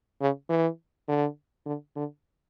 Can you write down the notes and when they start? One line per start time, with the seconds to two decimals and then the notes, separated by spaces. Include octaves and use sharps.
0.21 C#3
0.49 E3
1.08 D3
1.66 D3
1.96 D3